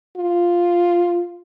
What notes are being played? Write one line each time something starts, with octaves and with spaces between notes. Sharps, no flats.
F4